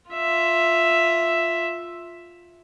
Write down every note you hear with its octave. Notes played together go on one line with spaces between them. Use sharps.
F4 E5